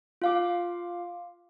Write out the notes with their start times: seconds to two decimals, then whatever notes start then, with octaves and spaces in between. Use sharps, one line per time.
0.22 F4 F5 D6